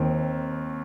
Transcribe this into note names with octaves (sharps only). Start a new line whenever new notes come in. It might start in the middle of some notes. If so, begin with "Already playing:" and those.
Already playing: D#2 D#3 C4